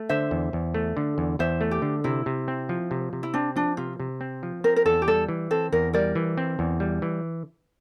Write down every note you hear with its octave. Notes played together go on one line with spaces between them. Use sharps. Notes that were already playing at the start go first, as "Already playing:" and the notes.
Already playing: A3
D3 C5 E5
E2
E2
A3
D3
E2
E2 C5 E5
A3
G4
D3
C3 E4
C3
C4
F3
C3
C3
E4
C4 D4
F3 D4
C3 F4
C3
C4
F3
C4 A#4
A#4
E2 A4
G4
G3 A4
E3
C4 A4
E2 A#4
G3 A#4 D5
E3
C4
E2
G3
E3